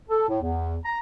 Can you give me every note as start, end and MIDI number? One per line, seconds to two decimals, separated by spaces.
0.09 0.27 69
0.28 0.38 45
0.42 0.76 40
0.85 0.98 82